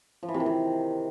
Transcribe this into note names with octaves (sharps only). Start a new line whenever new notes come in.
F3
E3
C3
D#3
C3